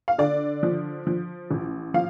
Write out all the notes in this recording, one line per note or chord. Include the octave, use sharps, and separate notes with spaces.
F5
D3 D5
F3
F3
A1
F3 F5